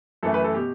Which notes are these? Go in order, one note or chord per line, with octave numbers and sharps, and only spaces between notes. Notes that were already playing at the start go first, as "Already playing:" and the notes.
F#2 E3 A3 A4
B4
A4
B2 G4